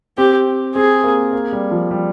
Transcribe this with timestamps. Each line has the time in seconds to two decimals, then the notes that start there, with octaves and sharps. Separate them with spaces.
0.18 C4 G4
0.75 C4 G#4
1.04 A#3
1.33 A#3
1.53 G3
1.71 F3
1.91 G3